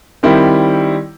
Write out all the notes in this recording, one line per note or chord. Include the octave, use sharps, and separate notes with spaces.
D#3 G3 C4 E4 G4